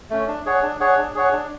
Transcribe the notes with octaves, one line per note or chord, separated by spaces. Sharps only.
A3 C#4
D4
G#4 C#5 F#5
D4
G#4 C#5 F#5
D4
G#4 C#5 F#5
D4